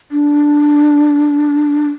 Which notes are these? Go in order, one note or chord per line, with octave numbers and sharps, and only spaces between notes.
D4